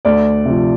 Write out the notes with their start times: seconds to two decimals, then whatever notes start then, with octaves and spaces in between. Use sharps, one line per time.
0.05 D2 D5
0.45 C3 F3